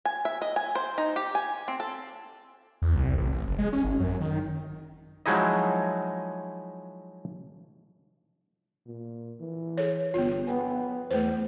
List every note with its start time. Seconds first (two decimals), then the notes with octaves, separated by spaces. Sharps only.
0.05 G#5
0.25 E5
0.42 D#5
0.56 G#5
0.75 C5
0.98 D#4
1.16 G4
1.35 G#5
1.68 C4
1.80 A4
2.82 E2
2.95 C2
3.18 A1
3.31 A1
3.46 F#1
3.59 G#3
3.73 C#4
3.85 G#1
4.00 F#2
4.20 D#3
5.26 F3 F#3 G#3 D#4 E4 D#5
8.86 A#2
9.40 E3
9.77 G#4 A4 C#5
10.14 G1 B3 F4
10.47 B3 G5 G#5
11.11 E2 A3 B4 C5